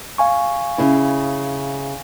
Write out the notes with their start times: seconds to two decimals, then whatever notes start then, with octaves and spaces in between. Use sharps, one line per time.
0.18 F5 G#5 C#6
0.78 C#3 E4